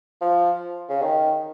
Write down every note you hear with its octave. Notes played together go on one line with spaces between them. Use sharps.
F3
C#3
D#3